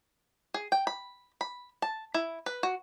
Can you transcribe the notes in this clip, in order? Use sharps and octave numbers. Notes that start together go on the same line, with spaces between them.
G#4
G5
B5
B5
A5
E4
B4
F#4